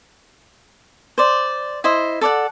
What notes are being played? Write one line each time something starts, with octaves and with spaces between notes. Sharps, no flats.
C5 D5
E4 C5 D#5
A4 D5 F#5